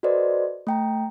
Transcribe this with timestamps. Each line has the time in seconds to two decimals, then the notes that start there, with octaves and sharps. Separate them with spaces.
0.03 F#4 A4 B4 C5 D5 D#5
0.67 A3 G5 A#5